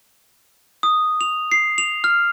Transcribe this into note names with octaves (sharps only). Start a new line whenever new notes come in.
D#6
F7
C7
F7
F6